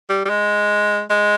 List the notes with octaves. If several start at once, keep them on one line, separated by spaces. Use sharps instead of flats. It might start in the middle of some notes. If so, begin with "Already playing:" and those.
G3
G3
G#3
G#3